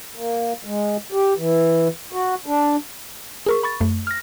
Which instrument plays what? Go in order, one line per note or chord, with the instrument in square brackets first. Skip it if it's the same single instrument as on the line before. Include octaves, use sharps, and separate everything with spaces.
[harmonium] A#3
G#3
G4
E3
F#4
D4
[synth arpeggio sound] G#4 A#4 C#6
B5 C#6 A6
F#2 A3
F6 A#6